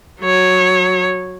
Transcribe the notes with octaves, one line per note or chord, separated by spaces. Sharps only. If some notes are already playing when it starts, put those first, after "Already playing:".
F#3 C#5